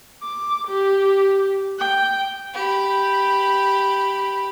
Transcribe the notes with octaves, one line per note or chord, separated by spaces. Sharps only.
D6
G4
G5
G4 B5